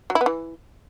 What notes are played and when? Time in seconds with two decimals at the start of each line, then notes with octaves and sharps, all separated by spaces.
0.10 F#3
0.15 E4
0.21 B3
0.26 E3